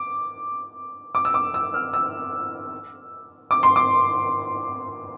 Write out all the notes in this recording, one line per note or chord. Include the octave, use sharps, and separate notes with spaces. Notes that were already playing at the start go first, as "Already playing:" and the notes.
Already playing: D6
D6
E6
D6
E6
F6
E6
D6
C6
D6